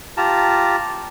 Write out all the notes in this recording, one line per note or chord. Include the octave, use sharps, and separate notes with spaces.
F4 G4 A5 A#5